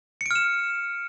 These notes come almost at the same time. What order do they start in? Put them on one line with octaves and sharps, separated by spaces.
C#7 D7 F6 E7